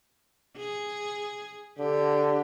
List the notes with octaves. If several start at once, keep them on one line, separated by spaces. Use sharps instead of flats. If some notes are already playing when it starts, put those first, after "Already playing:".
G#4
D3 G4